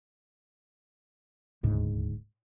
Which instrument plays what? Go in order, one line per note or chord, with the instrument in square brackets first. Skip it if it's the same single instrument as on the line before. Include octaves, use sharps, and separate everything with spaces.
[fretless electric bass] D#1 D2 G#2 C#3